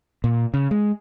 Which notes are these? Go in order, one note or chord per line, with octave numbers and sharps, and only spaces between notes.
A#2
C#3
G#3